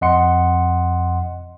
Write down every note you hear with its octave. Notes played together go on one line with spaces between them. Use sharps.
F2 D#5 F#5 C6 C#7